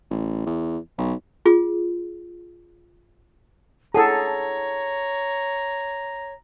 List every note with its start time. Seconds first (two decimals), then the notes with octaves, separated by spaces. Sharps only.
0.11 A1
0.46 E2
0.98 B1
1.45 F4 G#4
3.94 E4 G#4 A4 C#5 F#5 A5 A#5